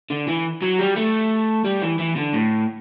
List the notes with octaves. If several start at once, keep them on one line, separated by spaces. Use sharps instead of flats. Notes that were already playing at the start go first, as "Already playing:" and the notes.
D3
E3
F#3
G3
A3
G3
E3
E3
D3
A2